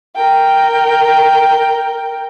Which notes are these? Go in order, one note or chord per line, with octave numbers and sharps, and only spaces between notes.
A#4 G5